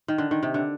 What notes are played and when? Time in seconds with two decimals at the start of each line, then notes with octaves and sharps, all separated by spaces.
0.08 D#3
0.18 D3
0.31 D#3
0.43 C3
0.54 D3